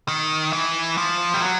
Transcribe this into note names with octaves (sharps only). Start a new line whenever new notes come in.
D#3
E3
F3
G3
F#3